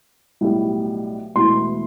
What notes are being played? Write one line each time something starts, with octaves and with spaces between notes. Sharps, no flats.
B1 A2 G3
E1 E2 B2 A3 E4 C6